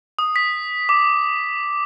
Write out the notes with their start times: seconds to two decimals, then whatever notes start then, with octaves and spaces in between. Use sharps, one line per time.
0.19 D#6
0.36 B6
0.89 D6